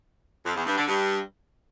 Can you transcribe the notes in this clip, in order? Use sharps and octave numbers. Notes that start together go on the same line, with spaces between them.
F2
E2
G2
D3
G2